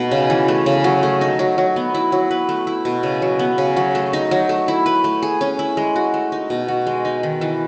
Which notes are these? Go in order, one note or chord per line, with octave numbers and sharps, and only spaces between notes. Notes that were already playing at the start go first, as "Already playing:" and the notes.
Already playing: B2 A3 D#4
C#3
E3
A3
C#3
F#3
A3
D#4
F#3
F#3
B3
E4
F#3
B4
A3
E4
B2
C#3
F#3
B3
C#3
F#3
A3
D#4
F#3
A3
E4
B4
A3
G#4
C#4
E4
G#3
F#4
A3
D#4
B2
F#4
G#3
D#4
D#3
E3